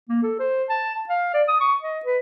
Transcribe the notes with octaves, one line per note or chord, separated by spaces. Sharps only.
A#3
A4
C5
A5
F5
D5
D#6
C#6
D#5
B4